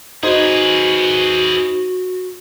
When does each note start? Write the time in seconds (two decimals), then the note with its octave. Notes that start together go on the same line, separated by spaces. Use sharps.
0.23 D#4 F#4 G#4 B4 C5 G#6